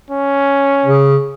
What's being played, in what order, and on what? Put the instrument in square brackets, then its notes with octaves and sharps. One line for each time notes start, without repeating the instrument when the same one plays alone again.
[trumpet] C#4
[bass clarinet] C#3